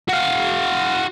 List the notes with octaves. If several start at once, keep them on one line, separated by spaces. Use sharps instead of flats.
F#4 F5